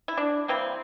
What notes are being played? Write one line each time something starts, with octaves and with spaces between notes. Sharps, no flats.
E4
D4
E3 G3 A#3 C4